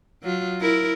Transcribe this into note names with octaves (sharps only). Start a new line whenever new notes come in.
F#3 F4
E4 A#4